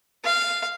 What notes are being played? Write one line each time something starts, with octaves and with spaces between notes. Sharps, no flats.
F5